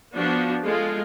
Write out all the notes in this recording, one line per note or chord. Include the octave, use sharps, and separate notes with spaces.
F3 B3 D4 F#4
G#3 A3 F4